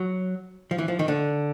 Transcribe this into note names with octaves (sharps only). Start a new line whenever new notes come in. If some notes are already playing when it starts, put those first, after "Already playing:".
Already playing: F#3
F3
E3
F3
D#3
D3